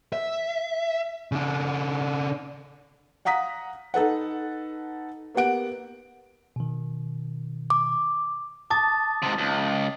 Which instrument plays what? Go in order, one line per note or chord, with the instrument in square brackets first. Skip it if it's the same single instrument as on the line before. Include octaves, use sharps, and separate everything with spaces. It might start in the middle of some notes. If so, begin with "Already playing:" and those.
[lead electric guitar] E5
C#3 D4
[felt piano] F5 F#5 A#5 D#6 B6
D#4 A4 B4 F#5
A#3 B3 G4 F#5 D7
[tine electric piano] B2 D#3
[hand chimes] D6
[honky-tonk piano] A5 [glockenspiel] D6 D#6 A6
[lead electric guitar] G#2 C3
C#2